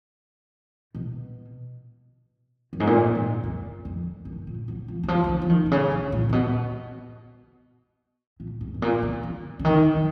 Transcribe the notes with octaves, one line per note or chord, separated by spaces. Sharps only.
B2
F#2
G#2
A#2
F#2
G#2
F#2
F2
F#2
A#2
F#3
F3
D#3
F3
F3
D#3
F3
D#3
B2
C#3
B2
A#2
A#2
B2
A#2
G#2
G#2
A#2
B2
C#3
C#3
D#3
F#3